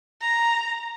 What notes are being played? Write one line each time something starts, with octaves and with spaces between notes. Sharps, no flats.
A#5